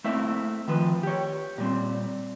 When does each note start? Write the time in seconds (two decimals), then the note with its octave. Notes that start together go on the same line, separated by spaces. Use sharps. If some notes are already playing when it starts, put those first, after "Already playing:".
0.04 A3 A#3 C4 E4 E5
0.68 D#3 F3 B4
1.03 G4 C#5
1.58 A#2 G3 C4